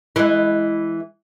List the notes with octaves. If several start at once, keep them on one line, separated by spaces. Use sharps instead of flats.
E3 G#3